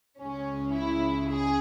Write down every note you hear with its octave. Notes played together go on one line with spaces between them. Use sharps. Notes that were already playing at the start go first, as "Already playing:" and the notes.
C#2 C#3 G#3 C#4
E4
G#4